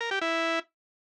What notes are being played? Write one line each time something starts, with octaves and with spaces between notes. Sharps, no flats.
A#4
G4
E4